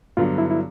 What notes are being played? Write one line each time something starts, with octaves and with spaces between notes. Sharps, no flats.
G2 D3 F#3 B3 F4
E4
E4